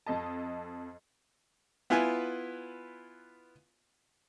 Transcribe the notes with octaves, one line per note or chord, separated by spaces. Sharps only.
F2 A4 D#5 A5
B3 E4 F4 B4 G#5